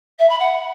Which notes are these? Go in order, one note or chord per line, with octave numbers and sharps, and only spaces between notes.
E5
B5
F#5